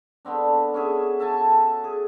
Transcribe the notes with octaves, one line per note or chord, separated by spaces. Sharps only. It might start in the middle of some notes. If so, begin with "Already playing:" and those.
D3 B3 C4 D4
C#4 F#4 G#4 E5
A4 E5 G#5 A5
G#4